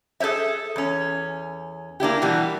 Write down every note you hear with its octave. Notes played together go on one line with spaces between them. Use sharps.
G#4 A4 C5 C#5 E5
E2 C#4
A#3 D4 E4 G4
B2 E3 G3 B3